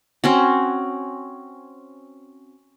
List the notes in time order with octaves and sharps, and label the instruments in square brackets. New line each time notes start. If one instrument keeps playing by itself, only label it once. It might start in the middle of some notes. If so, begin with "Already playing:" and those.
[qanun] C4 C#4 F#4